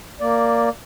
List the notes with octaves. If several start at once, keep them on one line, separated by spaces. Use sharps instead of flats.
A#3 D5